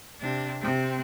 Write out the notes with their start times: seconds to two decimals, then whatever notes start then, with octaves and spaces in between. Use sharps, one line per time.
0.20 C3 D4
0.62 C3 C4